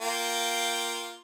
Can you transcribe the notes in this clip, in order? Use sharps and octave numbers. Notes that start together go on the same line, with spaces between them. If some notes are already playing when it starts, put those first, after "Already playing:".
A#3 F4 G5